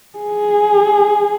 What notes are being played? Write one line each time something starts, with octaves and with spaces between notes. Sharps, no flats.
G#4